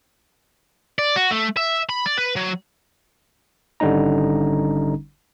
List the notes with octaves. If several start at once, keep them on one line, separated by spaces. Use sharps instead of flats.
D5
F#4
A3
E5
B5
D5
B4
F#3
G#1 D3 G3 C#4 D#4 A#5